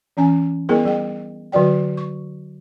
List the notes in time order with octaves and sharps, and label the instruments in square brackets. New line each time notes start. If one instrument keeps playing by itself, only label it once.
[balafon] E3 C#4 G#5
G3 B3 E4 G#4 A#4 C5
G3 G#4 G5
D3 F#3 F#4 D5 G5
C#6